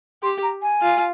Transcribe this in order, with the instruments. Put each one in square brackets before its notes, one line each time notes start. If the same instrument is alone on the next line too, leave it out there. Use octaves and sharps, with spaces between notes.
[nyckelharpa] G4 [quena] C6
[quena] A#5
G#5
[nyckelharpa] F4